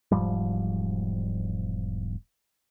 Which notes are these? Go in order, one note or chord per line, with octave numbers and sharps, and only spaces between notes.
E1 G#2 F3 G3